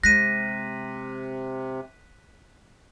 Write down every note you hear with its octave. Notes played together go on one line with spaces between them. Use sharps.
C3 G#3 F#6 A#6 B6 D#7